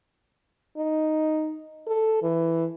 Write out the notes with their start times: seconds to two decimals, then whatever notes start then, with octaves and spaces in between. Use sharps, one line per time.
0.77 D#4
1.87 A4
2.22 E3